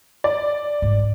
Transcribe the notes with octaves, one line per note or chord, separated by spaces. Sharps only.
D5
G#2 C4